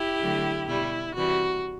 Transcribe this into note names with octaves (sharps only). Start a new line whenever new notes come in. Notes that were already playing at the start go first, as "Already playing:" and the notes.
Already playing: E4 G4
D3 F#3 A3
B2 G3 E4
C3 E3 G3 F#4